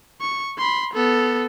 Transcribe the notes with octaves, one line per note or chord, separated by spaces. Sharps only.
C#6
B5 C6
B3 A4